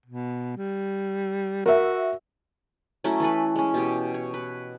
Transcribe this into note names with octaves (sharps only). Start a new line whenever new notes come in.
B2
G3
F#4 A#4 E5
F#3 A3 C#4 E4
E3 A4 B4
G#3 C#4
B2 G4
C#5
B4